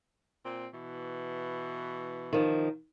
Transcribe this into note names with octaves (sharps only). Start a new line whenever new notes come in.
A#2 C4
B2 E3
D#3 F3